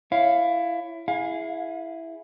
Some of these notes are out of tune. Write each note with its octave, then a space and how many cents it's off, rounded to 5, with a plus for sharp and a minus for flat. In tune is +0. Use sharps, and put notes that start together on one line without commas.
E4 +20 C#5 +0 F5 +0
E4 +0 G#4 +0 F5 +30